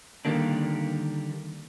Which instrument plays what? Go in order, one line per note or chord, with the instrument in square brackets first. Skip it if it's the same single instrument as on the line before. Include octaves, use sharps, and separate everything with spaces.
[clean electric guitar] D3 D#3 G3 A#3 D4